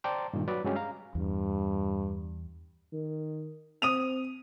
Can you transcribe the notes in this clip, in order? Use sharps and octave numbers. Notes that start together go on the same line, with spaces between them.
C5 D5 G5 A5 A#5 C6
G2 A#2 D#3
F#3 B4 D5
G2 F#3 G#3 C#4 G4
F5 A#5
E2 G2
D#3
C4 D#6 D#7 F7